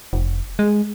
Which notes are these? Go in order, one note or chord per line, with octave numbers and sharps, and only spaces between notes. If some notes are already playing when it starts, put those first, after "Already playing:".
F1
G#3